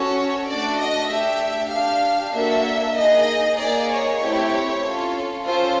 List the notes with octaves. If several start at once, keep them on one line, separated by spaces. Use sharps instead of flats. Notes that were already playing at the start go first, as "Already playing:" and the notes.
Already playing: C#4 F#4 A4 C#5
A3 D4 F#4 A4 D5
D#5
A3 D4 G4 E5
D4 G4 F5
A#3 D4 F#4 A4 E5
A#3 D#4 G#4 D#5
A#3 D#4 G#4 D5
C#5
A3 C4 E4 G4
C#4 F4 A4
C#4 F4 A4 C5